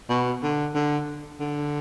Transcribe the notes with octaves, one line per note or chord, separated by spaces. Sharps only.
B2
D3
D3
D3